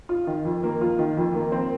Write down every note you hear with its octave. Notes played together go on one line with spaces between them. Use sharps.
F4
D#3
F2
A#3
F4
D#3
F2
A#3
C4